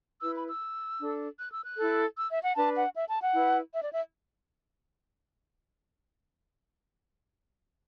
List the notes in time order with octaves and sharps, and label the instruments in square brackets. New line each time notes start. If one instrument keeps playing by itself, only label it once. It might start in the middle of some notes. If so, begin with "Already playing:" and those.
[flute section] E4 B4 E6
B5
E6
D4 A4
F#6
E6
F#6
E4 A4
E6
E5
F#5
D4 B4 A5
F#5
E5
A5
F#5
E4 B4
E5
D5
E5